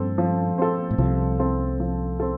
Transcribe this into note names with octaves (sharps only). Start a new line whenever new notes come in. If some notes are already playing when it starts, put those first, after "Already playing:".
Already playing: G2 F3 C4 A4
F3
C4 A4
A2
C2 C3 F3
C4 A4
F3
C4 A4